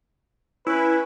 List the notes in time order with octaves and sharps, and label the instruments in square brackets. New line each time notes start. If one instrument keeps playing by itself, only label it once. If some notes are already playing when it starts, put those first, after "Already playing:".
[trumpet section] C#4 B4 [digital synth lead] E4